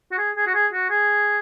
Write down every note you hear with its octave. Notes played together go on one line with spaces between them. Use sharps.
F#4
G#4
G#4
F#4
G#4
F#4
G#4